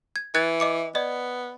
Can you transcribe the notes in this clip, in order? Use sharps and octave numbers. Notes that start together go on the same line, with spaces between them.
G#6
E3 F#6 G#6 A6
D#5 D6 C#7
B3 D5 D#5